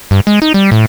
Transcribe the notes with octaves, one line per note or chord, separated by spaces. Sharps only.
G2
G#3
D#4
G3
A2